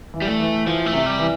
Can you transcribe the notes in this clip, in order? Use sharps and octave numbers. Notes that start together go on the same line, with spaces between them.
E3
G3
A3
E3
E3 F3
A3
C3
G3
E3